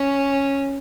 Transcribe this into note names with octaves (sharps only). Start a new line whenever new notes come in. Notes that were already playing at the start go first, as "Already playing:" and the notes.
Already playing: C#4